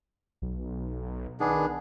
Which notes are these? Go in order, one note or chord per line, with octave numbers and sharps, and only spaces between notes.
B1
D#3 B3 D4 G#4